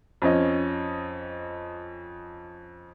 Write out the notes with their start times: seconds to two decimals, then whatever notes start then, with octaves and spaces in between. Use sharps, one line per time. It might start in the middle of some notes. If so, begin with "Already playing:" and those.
0.22 F2 C#4 D#5